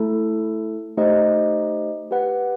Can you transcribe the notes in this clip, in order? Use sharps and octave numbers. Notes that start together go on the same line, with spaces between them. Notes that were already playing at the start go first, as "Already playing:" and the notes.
Already playing: A3 E4 A4
A3 D#4 G4 C5 D#5
G4 B4 F#5